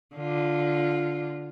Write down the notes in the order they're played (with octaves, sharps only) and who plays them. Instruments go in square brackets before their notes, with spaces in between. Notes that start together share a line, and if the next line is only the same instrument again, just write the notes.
[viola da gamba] D3 F4